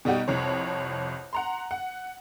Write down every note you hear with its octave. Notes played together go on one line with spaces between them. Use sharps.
B2 G3 D#4 F#4 G4
C2 F2 C#5
F#5 A#5 C6
F#5